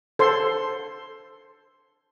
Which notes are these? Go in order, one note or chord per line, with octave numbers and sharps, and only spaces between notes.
A4 C5 C6